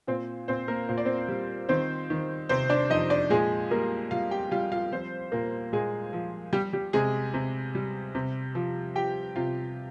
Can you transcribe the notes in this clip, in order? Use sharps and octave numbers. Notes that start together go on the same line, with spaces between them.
A#2 C4 C5
A#2 C4 C5
A#3 A#4
A#2 C5
D5
C4 C5
G3
D#3 C4 C5
D#3
C3 C4 C5
D4 D5
F2 D#4 D#5
D4 D5
A#2 G#3 G#4
G3 A#3 A#4
G3 F4 F5
G4 G5
G3 F4 F5
F4 F5
F3 C4 C5
A#2 A#3 A#4
A#2 G#3 G#4
F3
G3 G4
G3 G4
C3 G#3 G#4
C3
G3
C3
F3
F3 G4 G5
C3 F4 F5